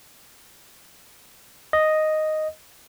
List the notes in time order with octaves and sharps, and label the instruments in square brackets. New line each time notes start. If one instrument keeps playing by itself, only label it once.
[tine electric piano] D#5